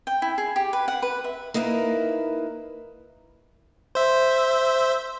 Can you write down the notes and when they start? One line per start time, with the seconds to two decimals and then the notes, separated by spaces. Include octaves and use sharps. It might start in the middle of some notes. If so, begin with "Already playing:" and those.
0.07 G5
0.22 E4
0.38 G#4
0.56 G4
0.73 B4
0.88 F#5
1.02 B4
1.24 E5
1.54 A#3 D#4 E4 A#4 B4
3.95 C5 E5